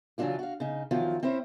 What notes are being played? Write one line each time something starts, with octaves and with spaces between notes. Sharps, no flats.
C#3 E3 F#3 D4 F4 G4
F#4 F5
C#3 D#4
E2 D#3 F3 F#3 F4
C4 C#4 E4 C5